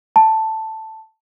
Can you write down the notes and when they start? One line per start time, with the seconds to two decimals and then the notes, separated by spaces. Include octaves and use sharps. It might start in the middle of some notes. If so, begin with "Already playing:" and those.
0.16 A5